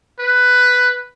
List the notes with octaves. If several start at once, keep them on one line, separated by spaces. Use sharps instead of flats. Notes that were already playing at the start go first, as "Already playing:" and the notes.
B4